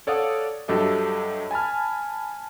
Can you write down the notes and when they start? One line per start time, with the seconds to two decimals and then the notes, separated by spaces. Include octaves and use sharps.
0.07 A4 C#5 D5 F5 F#5 D#6
0.68 G2 F#3 G4 A4 D#5 E5
1.51 G#5 A5 B5 F6